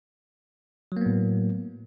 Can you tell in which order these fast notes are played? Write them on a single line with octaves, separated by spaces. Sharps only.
F#3 A#3 B3 A2